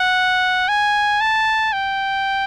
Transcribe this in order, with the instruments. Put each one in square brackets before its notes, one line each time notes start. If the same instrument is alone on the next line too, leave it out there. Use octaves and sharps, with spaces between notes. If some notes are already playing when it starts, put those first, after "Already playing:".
Already playing: [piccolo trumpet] F#5
G#5
A5
G5